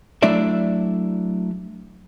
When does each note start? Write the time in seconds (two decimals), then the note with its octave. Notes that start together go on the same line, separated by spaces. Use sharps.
0.22 F#3 A3 D4 E4 D5 E5